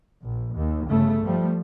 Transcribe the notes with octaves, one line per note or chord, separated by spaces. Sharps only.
A#1
D#2
G1 C#3 A3
F3 G3 A3